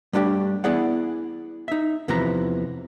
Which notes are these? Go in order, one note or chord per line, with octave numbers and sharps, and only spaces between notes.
G3 A3 D4 F4 G4
B3 E4 G#4 D5 F#5
D#4 E5
E2 C3 E3 F3 B4 A#5